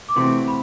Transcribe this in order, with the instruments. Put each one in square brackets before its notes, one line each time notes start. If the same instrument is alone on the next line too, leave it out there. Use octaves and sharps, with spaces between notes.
[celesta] D6
[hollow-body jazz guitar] C3 E3 A3 C4 F#4 [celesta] C6
[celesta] B5